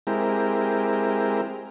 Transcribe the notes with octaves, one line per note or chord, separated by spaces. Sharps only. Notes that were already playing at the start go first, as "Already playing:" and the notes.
G#3 C4 E4 G4 A#4